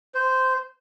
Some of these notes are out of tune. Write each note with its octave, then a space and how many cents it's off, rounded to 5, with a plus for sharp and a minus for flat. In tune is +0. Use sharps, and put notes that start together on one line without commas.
C5 -10